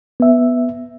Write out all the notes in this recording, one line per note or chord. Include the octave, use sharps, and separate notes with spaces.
B3 E5